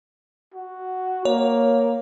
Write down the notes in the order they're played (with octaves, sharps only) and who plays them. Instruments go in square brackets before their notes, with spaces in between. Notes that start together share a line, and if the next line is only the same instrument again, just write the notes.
[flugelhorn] F#4
[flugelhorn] A#3 [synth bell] C#5